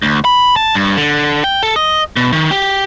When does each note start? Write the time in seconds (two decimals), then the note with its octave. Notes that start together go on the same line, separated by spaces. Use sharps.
0.02 D2
0.25 B5
0.56 A5
0.74 G2
0.97 D3
1.44 G5
1.63 A4
1.76 D#5
2.16 B2
2.33 D#3
2.51 G4